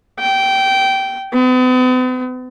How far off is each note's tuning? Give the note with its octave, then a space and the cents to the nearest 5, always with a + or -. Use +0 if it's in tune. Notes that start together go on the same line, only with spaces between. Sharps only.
G5 -15
B3 +45